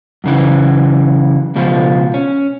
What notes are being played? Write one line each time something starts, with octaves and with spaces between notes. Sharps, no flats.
F#2 C#3 E3
C#2 B2 F3
C#4